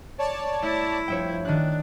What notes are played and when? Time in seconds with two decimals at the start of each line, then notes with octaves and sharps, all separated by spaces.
0.18 C#5 D5 A5
0.62 A3 E4
1.08 G2 F3 C#5 E5 G5
1.45 D#3 D4 F#6